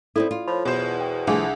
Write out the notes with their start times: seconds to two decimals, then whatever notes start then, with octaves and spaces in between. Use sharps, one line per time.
0.16 C4 D#4 E4 A4 D5
0.31 F4
0.48 F3 C#5 B5
0.65 E2 B2 C5
1.00 G5
1.27 C2 F3 A3 D4 G#4 G#5